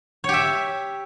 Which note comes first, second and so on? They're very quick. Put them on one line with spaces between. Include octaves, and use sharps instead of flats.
C#5 G4 E5